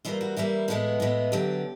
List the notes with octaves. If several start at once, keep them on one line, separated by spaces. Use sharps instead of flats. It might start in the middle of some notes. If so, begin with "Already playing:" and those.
E3 G3 A#3 F4
F#4
E3 G3 A#3 E4
A2 E3 G#3 B3 F#4
A2 E3 G#3 B3
D3 F#3 B3 G4